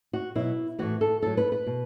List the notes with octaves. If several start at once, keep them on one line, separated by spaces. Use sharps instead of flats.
F#4
B2 F#3 E4
A2 E3 F#4
A4
A2 F#3 A4
B4
B4
B2